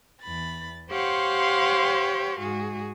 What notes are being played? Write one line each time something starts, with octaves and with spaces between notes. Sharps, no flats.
E2 B5 A6
G4 C5 C#5 F5 F#5 C6
G#2 F#4 G#4